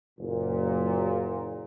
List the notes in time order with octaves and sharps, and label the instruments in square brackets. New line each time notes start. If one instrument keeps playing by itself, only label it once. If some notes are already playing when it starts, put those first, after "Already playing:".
[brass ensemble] F#1 A#2